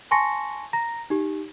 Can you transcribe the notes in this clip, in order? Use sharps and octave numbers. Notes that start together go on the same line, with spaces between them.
G#5 A5 C6 C#6 A#6 C#7
A#5 A#6
D#4 G4